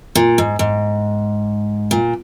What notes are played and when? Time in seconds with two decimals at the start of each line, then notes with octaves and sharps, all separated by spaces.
0.15 A#2
0.38 G#2
0.59 G#2
1.91 A#2